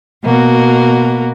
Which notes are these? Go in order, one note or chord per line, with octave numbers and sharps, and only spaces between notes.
B2 A#3 F#4